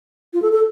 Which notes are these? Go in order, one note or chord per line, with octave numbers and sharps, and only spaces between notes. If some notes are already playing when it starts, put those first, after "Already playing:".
F4
A4
A4